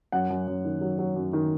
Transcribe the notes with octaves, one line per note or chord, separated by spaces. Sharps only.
F#2 F#5
F#2
F#2
D#3
F#3
F#3
F#2
D#3